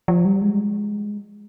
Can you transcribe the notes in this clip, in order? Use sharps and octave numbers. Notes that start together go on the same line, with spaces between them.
F3
G3
G#3